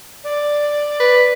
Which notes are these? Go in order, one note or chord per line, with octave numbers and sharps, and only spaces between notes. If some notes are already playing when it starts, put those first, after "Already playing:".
D5
B4